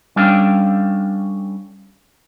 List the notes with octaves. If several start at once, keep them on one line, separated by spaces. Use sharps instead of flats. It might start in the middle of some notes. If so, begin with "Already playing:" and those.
G3 C#4 D4 A4 F5 G5